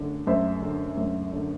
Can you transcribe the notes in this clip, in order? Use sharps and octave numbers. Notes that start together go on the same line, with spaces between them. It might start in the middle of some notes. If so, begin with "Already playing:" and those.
Already playing: F#2 D3
F#2 C5 E5
D3
F#2
D3